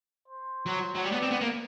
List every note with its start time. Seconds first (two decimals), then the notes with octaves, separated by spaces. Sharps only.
0.28 C5
0.66 F#3
0.95 F#3
1.04 G3 D5
1.12 B3
1.22 C4
1.31 B3
1.41 A#3